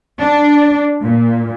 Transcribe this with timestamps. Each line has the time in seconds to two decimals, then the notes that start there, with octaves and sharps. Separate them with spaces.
0.19 D4
1.04 A#2